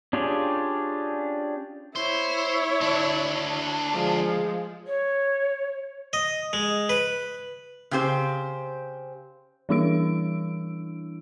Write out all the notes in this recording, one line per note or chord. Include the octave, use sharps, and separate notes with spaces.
C#4 D4 F4 G4 G#4
E4 C5 C#5
D2 D4
F3 G#3
C#5
D#5
G#3
B4
C#3 C4 G4 C5
E3 G3 D4 E4 E6 D7